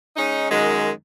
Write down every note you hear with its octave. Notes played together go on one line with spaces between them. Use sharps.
G#3 C#4 D#4
F#2 D#3 G#3